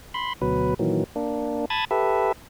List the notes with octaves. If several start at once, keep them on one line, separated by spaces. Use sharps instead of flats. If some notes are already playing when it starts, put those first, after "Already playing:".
B5 C6
D2 B2 F#3 B4
A#2 D#3 E3 F#3
A#3 D4
A5 B5 D#6 G#6 A6
G4 A4 B4 E5